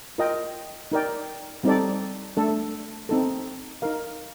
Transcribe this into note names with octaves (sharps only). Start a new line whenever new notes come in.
F4 A#4 D#5 G5
D#4 A#4 D5 G5
G3 C4 D#4 A4 D5
A3 D4 A4
C4 D#4 A4
D#4 A#4 F5